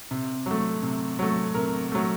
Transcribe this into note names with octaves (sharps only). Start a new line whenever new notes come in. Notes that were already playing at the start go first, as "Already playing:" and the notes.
C3
F#3 A3
C3
F#3 A3
C3 A#4
F#3 A3